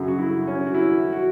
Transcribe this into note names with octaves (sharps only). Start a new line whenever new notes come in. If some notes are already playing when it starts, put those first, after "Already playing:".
Already playing: F#2 C#3 F#3
F#4
E4
C#4
F#4
E4
F#4